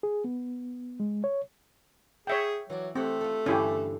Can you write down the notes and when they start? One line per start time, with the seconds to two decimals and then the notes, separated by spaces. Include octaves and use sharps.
0.03 G#4
0.24 B3
1.00 G#3
1.24 C#5
2.27 G#4 C#5 E5 G5
2.70 E3 F#3 F#4 D5
2.95 A3 C4 G4 A4 F#5
3.21 F4 A4
3.46 G2 D3 E3 C#4 E4 G4